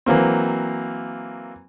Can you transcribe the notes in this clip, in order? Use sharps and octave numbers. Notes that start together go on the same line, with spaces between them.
E3 F#3 A#3 C4